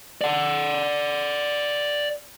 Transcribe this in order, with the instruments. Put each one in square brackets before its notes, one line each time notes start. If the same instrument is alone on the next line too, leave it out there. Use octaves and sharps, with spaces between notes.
[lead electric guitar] D5 F#5